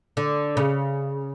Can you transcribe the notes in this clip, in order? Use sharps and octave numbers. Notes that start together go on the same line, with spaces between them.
D3
C#3